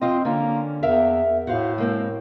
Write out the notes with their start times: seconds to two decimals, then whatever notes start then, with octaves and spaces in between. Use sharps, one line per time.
0.01 F2 C4 F4 D#5
0.25 D3 A#3 C#4
0.83 E2 A#4 E5 F5
1.47 A2 F#4 C5 F5
1.78 G#3 A#3 C4